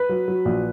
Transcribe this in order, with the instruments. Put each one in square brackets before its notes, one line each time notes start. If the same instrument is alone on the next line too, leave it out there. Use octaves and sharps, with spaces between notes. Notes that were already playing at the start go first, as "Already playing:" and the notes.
Already playing: [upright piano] B4
F#3
F#3
A#1